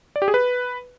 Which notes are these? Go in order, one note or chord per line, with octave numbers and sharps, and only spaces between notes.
D5
G4
G#4
B4